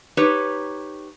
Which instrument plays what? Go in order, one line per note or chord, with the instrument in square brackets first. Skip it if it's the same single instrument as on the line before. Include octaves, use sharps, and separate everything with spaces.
[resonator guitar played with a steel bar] D#4 G4 B4 C#5